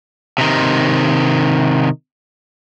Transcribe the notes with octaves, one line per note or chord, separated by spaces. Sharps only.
C3 D#3